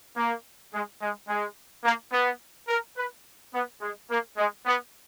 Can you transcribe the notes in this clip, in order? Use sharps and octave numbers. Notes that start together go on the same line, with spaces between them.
A#3
G#3
G#3
G#3
A#3
B3
A#4
B4
B3
G#3
A#3
G#3
B3